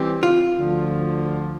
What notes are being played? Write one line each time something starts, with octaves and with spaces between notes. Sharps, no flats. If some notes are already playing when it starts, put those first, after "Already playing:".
Already playing: E3 G3 C4 G4
F4
D2 D3 F3